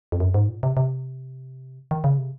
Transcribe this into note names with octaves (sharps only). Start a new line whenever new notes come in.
F2
F#2
G#2
A#2
C3
C3
D#3
C#3
C3